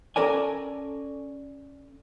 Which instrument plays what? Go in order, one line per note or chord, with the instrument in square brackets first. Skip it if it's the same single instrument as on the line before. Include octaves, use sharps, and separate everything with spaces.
[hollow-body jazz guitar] C#4 A4 A#4 D5 G#5